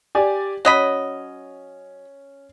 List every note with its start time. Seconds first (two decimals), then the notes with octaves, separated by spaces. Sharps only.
0.15 G4 D5 G#5
0.65 F#3 C#4 D#5 B5